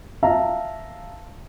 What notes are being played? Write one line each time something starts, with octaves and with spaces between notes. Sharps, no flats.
E5 F5 A5 A#5